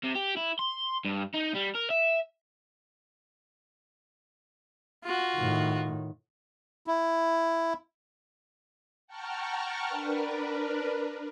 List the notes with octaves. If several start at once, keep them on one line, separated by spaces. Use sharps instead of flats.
C3
G4
E4
C6
G2
D#4
G3
A#4
E5
F4 F#4
A2 D#3
E4
F#5 G5 A5 A#5 C#6 F6
D4 A#4 B4